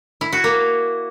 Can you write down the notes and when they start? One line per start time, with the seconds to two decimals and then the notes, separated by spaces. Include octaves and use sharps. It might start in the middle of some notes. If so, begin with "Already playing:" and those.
0.21 E4
0.32 F#4
0.44 A#3